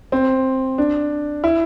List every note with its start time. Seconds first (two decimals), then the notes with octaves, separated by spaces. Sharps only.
0.12 C4
0.78 D4
1.44 E4